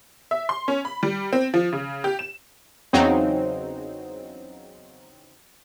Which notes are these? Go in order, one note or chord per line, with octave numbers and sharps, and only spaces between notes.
E5
C6
C#4
B5
G3
C4
F3
C#3
G4
E7
E2 C#3 F#3 C4 D#4